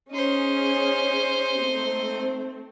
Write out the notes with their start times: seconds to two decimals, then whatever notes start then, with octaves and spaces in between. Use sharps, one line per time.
0.11 C#4 D#4 G#4 C5
1.62 A3 C4